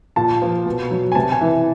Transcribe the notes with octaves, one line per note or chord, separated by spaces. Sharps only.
A#2 A5
F3
B2
F#3
G#5
C3 A5
G#5
E3